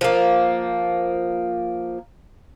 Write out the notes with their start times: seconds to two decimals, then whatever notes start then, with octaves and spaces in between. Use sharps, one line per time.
0.01 F3 A#3